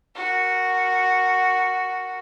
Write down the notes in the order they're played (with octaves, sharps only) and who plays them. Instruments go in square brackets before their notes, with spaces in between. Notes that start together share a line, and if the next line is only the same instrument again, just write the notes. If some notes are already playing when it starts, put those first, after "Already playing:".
[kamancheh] F#4 A#4